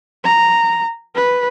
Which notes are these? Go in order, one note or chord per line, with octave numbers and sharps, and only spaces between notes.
A#5
B4